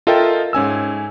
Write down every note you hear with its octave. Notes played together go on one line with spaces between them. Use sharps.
F4 A4 A#4 D#5 E5 G5
G#2 C#4 G#5 E6